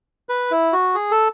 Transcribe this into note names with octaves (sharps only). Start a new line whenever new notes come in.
B4
E4
F#4
G#4
A4